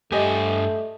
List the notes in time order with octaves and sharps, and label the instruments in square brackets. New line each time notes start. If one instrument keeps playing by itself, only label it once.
[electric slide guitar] G2 G#5 [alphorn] A3 [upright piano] G4 D#5